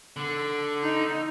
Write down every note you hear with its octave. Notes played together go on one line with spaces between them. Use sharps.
D3
D#4